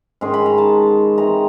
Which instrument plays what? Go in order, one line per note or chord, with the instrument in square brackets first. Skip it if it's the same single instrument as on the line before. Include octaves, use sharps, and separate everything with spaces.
[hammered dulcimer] G#2 D#3 G#3 C#4 C6
B5
A#5
A5
E3 G#3 C4 D#4 A#5